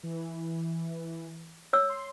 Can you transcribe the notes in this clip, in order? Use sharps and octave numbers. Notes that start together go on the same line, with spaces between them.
E3
C#5 E6
C6